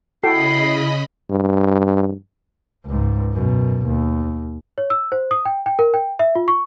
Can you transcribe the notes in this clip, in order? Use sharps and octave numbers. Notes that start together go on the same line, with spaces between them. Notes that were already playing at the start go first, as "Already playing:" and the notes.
C#3 E4 F#4 A4 D#5 G5 B5 C7
G2
C#2 G#2
F#2 B2
D#2
C#5
E6
C5
D#6
G5
G5
A#4
G5
E5
F4
C#6